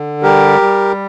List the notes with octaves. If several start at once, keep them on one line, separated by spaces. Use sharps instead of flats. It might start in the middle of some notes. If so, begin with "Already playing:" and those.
Already playing: D3
G3 G4 A#4
G3